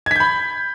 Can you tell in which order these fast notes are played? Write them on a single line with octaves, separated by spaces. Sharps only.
G#6 B6 G6 B5